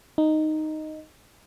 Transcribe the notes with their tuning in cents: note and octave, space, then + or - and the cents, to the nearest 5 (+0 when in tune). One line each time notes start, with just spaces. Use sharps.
D#4 -5